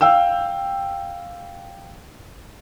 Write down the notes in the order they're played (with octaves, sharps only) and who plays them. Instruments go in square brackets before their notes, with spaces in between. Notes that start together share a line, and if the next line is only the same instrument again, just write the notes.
[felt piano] F5 G5 E6